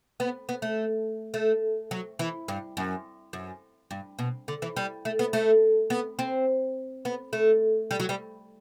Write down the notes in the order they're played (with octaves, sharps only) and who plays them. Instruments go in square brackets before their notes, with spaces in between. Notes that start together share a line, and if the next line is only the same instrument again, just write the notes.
[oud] B3
B3
A3
A3
F#3
E3
G2
F#2
F#2
G2
B2
D3
E3
G3
A3
B3
A3
B3
C4
B3
A3
G3
F#3
G3